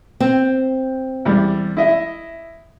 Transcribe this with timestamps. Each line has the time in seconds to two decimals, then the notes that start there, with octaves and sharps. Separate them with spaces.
0.20 C4
1.25 E2 G3
1.77 E4 D#5 E5